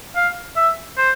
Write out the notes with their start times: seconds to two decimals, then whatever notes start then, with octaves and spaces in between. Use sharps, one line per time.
0.16 F5
0.56 E5
0.98 C5